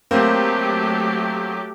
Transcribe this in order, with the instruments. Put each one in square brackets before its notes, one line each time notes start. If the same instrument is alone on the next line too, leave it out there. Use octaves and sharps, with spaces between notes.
[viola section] F#3 A3 G4 [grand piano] A#3 C4